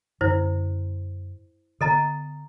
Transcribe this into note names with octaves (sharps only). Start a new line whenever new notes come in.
F#2 D3 C#4 E4 C5
D3 B3 A4 D#5 A#5